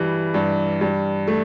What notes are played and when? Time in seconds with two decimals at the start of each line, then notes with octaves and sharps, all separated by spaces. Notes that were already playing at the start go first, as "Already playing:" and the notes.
Already playing: G2 E3 G3
0.34 G2
0.81 G2
1.27 A3